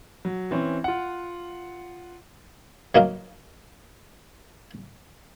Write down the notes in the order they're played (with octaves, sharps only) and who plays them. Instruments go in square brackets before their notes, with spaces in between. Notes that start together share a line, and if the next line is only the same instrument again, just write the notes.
[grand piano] F#3
E3 C4 C#4
F4 F#5
[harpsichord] F#3 A#3 D#4 A#4 F5